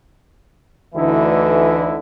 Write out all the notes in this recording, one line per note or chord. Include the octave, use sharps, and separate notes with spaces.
D2 D3 E3 D#4 E4